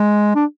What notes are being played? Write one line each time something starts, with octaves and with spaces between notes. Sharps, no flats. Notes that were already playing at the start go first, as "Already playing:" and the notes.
Already playing: G#3
D4